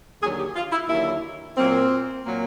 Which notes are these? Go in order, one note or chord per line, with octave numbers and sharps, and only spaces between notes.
D#2 D3 F#3 G#4
G4
F4
E4
D#2 D3 F#3 E4
A#2 F#3 A#3 C4
A#2 F#3 A#3